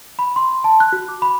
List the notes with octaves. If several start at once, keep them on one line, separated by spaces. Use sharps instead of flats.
B5
C6
A5
F#6
F#4
D6
B5